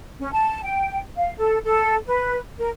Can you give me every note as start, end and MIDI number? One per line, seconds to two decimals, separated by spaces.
0.19 0.32 61
0.32 0.60 81
0.63 0.99 79
1.16 1.33 77
1.37 1.58 69
1.65 1.95 69
2.06 2.38 71
2.58 2.69 70